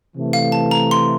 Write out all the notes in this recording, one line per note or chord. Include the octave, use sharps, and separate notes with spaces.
C3 E3 A3
F5
A5
A#5
C6